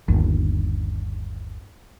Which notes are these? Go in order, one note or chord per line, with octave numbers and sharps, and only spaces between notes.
G1 D#2